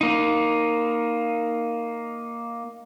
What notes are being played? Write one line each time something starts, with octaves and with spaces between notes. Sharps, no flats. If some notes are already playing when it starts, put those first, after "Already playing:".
A#3 D#4